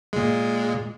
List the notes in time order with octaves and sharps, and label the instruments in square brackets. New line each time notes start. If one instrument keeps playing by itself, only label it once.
[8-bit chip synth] A#2 G#3